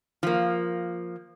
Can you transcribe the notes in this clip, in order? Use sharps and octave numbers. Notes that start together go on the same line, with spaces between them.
F3 A#3